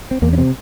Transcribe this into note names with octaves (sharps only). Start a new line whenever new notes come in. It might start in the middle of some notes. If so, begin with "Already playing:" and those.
C4
E2 A#3
C#4
C3 C4